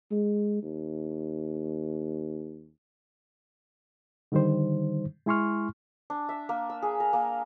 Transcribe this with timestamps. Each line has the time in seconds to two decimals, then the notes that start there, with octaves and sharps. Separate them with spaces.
0.11 G#3
0.63 D#2
4.32 D3 D#3 G3 D#4 C5
5.26 G#3 E4 G#5 C6 C#6 F6
6.10 D4
6.29 E5
6.49 A#3
6.70 E6
6.82 G#4
7.00 A#4
7.13 A#3